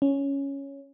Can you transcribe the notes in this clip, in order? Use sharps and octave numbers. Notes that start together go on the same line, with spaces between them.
C#4